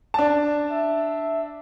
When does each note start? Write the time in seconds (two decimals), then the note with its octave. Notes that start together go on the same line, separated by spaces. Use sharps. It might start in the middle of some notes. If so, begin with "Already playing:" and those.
0.14 D4 A5
0.71 E5